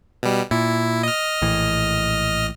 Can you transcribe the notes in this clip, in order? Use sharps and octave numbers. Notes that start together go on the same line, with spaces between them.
B2 G3
A#2 E4
D#5 F6
A#1 A2 E3